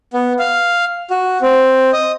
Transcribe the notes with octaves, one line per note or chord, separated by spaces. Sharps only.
B3
F5
F#4
C4
D#5